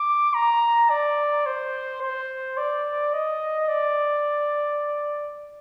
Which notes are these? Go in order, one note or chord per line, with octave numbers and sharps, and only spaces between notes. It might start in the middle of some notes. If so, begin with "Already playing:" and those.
Already playing: D6
A#5
D5
C5
C5
D5
D#5
D5